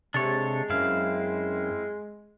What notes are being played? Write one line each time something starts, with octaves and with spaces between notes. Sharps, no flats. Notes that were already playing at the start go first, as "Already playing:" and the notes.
C3 G#3 D4 A4 C#5
F#2 C4 E4 F5